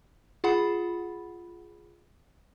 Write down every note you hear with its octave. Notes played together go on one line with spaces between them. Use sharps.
F4 G#4 F#5 B5